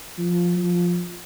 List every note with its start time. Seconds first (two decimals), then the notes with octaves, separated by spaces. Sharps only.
0.18 F3
0.57 F3